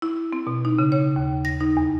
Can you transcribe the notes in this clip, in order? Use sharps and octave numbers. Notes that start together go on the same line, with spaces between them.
E4
C4
B2
D#4
C#3
C#5
D#2
A#6
D#4
E2